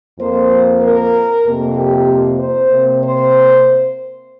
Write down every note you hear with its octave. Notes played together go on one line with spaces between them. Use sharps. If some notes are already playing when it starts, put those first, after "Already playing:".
F2 F3 A#3 C5
A#4
F2 C3 A#3
G4
C5
C3 A#3
C5